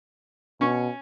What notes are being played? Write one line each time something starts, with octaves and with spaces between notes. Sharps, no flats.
B2 C#4 C#6